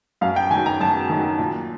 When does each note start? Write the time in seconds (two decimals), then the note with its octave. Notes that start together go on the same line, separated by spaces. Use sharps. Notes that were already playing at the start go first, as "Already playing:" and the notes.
0.21 F#2 F5
0.36 G5
0.50 D#3 G#5
0.55 F#3
0.66 A#5
0.80 F#2 A5
1.09 D#3 F#3
1.39 A#2